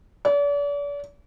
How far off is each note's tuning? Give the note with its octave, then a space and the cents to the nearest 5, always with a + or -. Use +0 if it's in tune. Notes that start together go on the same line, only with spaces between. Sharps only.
D5 -40